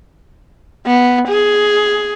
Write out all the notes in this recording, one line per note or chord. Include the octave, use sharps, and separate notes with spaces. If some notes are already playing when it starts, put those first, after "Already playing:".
B3
G#4